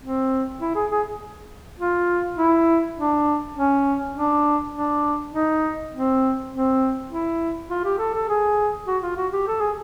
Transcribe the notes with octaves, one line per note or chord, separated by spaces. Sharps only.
C4
E4
G#4
G#4
F4
E4
D4
C#4
D4
D4
D#4
C4
C4
E4
F4
G4
A4
A4
G#4
F#4
F4
F#4
G4
A4
G#4